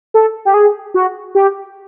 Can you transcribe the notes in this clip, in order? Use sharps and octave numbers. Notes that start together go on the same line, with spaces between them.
A4
G4
G#4
F#4
G4